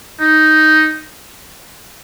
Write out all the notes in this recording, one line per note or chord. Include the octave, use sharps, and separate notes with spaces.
D#4